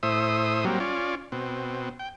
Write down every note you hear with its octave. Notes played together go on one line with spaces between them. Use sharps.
A2 C5 E5 D#6
F#3 G3 A#3 C4
C#4 F4 D5
B2 C4
G5